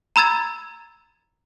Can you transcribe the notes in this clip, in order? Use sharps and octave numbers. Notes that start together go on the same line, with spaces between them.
A#5 B5 E6 G#6 A6